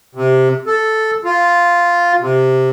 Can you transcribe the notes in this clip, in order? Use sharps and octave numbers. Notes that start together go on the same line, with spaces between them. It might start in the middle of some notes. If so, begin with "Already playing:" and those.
C3
A4
F4
C3